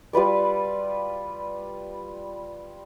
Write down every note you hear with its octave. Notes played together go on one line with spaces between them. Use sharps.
G3 F4 B4 D5